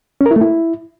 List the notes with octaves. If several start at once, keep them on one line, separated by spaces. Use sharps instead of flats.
C#4
A#4
E4
A3
E4